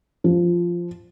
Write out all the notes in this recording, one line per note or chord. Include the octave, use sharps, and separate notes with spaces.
F3